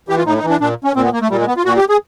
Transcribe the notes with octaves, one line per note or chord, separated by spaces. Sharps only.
E3 G4
F4
A2 D#4
D#4
E3
D4
A#2 D4
C#4
A#2 C4
B3
A#3
A3
A#2 G3
G#3
B3
F4
A#2 F#4
G4
G#4